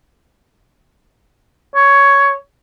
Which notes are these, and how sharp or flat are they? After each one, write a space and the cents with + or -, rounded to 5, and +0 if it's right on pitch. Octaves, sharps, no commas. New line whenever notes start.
C#5 +10